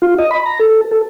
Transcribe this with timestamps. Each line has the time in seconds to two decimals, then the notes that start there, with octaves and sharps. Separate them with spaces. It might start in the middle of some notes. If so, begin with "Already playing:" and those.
0.02 F4
0.19 D#5
0.31 B5
0.46 A#5
0.59 A4
0.91 A4